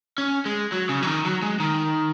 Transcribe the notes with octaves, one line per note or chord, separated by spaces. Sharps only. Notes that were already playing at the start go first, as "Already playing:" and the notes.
C#4
G#3
F#3
C#3
F#3
D#3
F#3
G#3
D#3